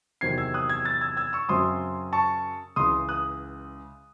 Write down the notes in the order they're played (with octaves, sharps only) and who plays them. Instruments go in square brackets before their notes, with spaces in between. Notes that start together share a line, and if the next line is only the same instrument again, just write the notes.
[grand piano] E2 C3 D#3 F#3 C4 G#6 C7
E6 G#6
D#6 F#6
E6 G#6
F#6 A6
E6 G#6
E6 G#6
C#6 E6
F#2 C#3 F#3 C4 C6 D#6
A5 C#6
C#2 C#3 E3 C6 D#6
D#6 F#6